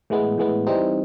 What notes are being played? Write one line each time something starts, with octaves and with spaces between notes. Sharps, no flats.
A2 E3 G#3 B3
A2 E3 G#3 B3
E3 G3 C4 D#4